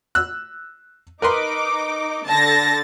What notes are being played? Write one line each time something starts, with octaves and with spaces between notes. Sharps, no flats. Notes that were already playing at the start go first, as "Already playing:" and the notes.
E6 F#6
D#4 A#4 B4 C6 D6
D3 A5 A6 A#6